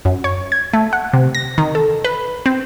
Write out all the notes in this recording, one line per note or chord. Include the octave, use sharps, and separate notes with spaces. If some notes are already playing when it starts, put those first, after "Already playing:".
F#2
C#5
G#6
A3
F#5
C3
A#6
D#3
A4
B4
C4